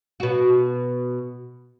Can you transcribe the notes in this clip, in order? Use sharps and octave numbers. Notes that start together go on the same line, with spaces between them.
B2 F#4